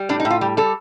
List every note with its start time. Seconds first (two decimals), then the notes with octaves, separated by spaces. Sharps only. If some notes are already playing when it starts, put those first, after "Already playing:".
Already playing: G3
0.09 A2 D4
0.20 D#4
0.25 A2
0.30 F4
0.41 G3 G4
0.57 G3 A4